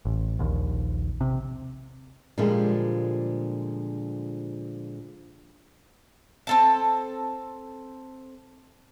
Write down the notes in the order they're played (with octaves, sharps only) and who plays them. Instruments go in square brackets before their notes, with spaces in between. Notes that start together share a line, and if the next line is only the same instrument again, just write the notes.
[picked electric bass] A1
A#1 D#2
C3
[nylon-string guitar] A#2 D3 F3 G3 G#3
[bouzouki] C4 A4 A5